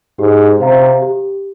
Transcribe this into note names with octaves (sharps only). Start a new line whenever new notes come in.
G#2 G4
C3 C5 F5 A#5
G4